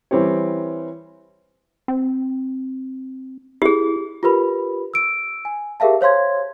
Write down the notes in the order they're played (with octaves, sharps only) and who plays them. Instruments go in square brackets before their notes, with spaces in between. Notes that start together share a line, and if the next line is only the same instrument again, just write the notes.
[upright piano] E3 G3 C4 G4 C#5
[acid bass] C4
[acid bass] E4 [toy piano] G4 G#4
[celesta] F4 G4 A#4 B4 B5
E6 D7
G#5
G4 G#4 A#4 E5 F5 A5
C5 C#5 F5 C6 G#6